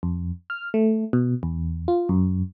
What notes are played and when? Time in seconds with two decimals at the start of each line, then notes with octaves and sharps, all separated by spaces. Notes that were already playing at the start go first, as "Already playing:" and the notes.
0.03 F2
0.50 F6
0.74 A3
1.13 B2
1.43 E2
1.88 F4
2.09 F#2